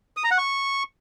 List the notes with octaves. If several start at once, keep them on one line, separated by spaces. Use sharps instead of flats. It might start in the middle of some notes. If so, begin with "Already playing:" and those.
D#6
A#5
F#5
C#6